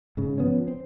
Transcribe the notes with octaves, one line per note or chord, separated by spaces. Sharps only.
G#2 C#3
F3 B3 C#4
C4